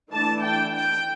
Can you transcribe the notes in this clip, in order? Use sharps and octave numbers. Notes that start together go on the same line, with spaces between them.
E3 A3 D4 A5
G5
G5